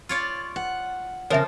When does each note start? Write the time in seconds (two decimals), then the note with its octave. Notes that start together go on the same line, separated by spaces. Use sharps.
0.09 F4 C#5 D5
0.56 F#5
1.30 E2 C#3 F3 A#4 C#5 E5